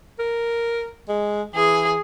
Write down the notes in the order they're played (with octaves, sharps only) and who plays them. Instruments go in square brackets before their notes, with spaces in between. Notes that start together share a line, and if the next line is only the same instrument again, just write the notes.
[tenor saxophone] A#4
G#3
[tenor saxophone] E3 [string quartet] G#4